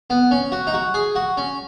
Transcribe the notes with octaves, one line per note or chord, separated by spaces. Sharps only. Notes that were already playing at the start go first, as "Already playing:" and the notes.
B3
C#4
F#4
D#4
F#4
G#4
F#4
C#4